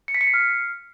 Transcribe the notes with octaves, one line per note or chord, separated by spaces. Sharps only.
C#7
B6
C#7
C7
F6